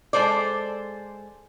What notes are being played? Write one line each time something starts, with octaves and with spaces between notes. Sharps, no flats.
G#3 A4 C5 D5